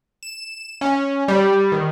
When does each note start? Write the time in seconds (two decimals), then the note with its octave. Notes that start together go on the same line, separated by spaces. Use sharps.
0.23 E7
0.81 C#4
1.28 G3
1.72 D#3